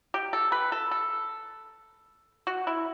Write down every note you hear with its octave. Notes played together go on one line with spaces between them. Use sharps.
G4
A4
B4
A4
A4
F#4
E4